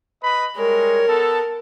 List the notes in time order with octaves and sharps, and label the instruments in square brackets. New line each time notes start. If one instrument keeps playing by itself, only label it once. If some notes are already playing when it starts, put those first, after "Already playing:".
[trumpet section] B4 D#5 B5
[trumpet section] G3 G#3 C#5 [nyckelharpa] A#4
[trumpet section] B3 A4